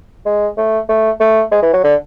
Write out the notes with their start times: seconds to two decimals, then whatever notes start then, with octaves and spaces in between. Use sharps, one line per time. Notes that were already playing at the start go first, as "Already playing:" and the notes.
0.25 G#3
0.57 A3
0.89 A3
1.20 A3
1.51 G#3
1.62 E3
1.73 F#3
1.84 D3